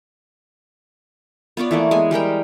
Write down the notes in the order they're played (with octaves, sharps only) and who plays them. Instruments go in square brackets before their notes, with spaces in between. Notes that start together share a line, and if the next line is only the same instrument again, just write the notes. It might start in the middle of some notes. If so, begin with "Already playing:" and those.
[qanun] B3 F4 C#5 D5
E3 A3 A#3
G#3 B3 G#5
G3 G#3 A#4 G5